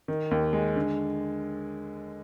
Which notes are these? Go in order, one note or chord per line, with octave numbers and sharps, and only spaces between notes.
D#3
D#2
G#3
D3